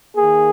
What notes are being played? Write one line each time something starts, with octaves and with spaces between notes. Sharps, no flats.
D#3 A#3 G#4